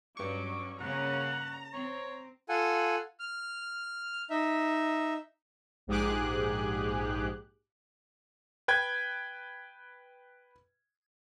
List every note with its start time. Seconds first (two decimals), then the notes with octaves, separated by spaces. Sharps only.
0.17 G2 F#3 C#4 C#6 D6
0.81 C#3 A#3 C#4 F#5 A#5
1.73 C4 C#5
2.49 F4 A4 F#5 G#5
3.20 F6
4.30 D#4 E5
5.87 A#1 G#2 G4 G#4 D6 F#6
8.68 B4 G5 G#6